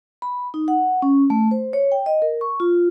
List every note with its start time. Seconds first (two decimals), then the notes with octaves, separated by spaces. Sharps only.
0.22 B5
0.54 D#4
0.68 F#5
1.02 C#4
1.30 A3
1.51 C5
1.73 C#5
1.92 G5
2.06 D#5
2.22 A#4
2.41 C#6
2.60 F4